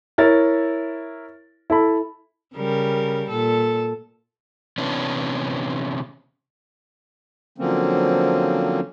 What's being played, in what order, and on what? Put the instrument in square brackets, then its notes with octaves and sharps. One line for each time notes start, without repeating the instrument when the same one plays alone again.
[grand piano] E4 A#4 C#5 A6
E4 A4 B5
[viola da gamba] C#3 G3 A#4
A#2 A4
[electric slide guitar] C3 E3 B3 C#4 D4
[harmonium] D3 F3 F#3 A#3 C4 C#4